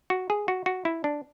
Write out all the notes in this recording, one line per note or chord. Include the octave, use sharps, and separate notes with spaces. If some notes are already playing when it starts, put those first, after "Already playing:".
F#4
G#4
F#4
F#4
E4
D4